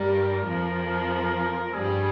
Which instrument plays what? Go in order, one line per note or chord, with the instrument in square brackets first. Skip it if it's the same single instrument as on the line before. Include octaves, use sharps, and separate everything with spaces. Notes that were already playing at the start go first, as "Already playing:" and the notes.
Already playing: [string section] G2 G3 [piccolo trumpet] A#4
[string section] F2 F3
[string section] G2 G3 [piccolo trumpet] G#4